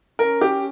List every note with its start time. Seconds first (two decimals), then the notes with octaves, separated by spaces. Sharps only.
0.19 C#4 A#4
0.41 G4